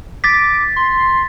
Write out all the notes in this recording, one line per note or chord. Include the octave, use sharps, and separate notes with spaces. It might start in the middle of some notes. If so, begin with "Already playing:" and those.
D6 A6 B6
C6